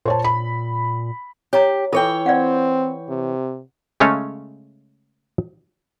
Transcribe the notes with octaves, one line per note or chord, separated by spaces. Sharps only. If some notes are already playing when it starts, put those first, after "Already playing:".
A#2 C5 C#5 A5
B5
G4 C#5 A#5
E3 F4 A4 C#5 G5
C4 D5 F5 F#5
C3
C#3 G#3 A3 C#4 C#5 F5